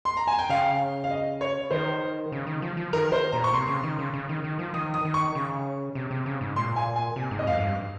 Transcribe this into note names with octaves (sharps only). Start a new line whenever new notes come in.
C6
A#5
G#5
G5
C#3 F5
F5
D#5
C#5
D#3 C5
C#3
D#3
F3
F3
D#3 A#4
C5
A#2 A#5
C#6
C3 C6
C#3
D#3
C#3
C#3
D#3
D#3
F3
D#3 D#6
D#6
D#3
C#6
C#3
C3
C3
C#3
G#2
A#2 C6
G#5
G#5
C3
G#2
D#5
F2 F5
G#2
G2